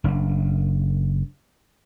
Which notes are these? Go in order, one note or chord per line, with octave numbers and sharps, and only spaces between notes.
F#1 D4